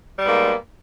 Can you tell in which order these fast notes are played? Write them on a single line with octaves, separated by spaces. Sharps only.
G3 B3 G#2 A#3